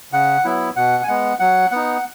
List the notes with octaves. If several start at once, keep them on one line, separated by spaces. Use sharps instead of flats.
C#3 F#5
F#3 B3 E4
B2 F#5
G#5
G#3 B3 F#5
F#3 F#5
B3 D#4 F#5